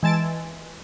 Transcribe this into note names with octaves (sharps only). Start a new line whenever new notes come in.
E3 G#3 A5 A6 D7